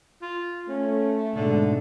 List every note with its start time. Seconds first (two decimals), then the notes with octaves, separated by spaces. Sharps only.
0.22 F4
0.68 A3 C#4
1.35 G#2 B2 D3